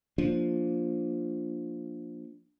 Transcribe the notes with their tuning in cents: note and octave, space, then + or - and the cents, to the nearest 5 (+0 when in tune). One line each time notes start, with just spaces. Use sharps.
F3 +0 A#3 +0 D4 +0